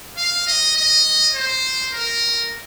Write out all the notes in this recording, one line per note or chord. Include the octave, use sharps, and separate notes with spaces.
F5
D#5
D#5
C5
A#4